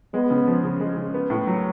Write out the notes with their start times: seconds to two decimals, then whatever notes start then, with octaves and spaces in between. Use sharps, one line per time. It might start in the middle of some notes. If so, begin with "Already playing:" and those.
0.14 G#3 B3
0.31 C#3
0.47 F3
0.63 C#3
0.80 G#3
0.97 C#3
1.14 B3
1.30 A2
1.47 F#3